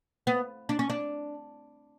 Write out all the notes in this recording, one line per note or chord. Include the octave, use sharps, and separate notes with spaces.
B3
D4
C#4
D4